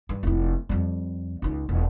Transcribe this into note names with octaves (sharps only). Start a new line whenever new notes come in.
G2
F1 E4
F2 G3
C#2 D#4
E1